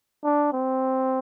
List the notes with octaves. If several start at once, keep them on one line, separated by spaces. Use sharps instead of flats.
D4
C4